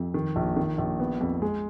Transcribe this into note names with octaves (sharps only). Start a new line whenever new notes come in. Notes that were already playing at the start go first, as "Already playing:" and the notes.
Already playing: F2
D#3
A#1
D#3
A#1
B3
F2
G#3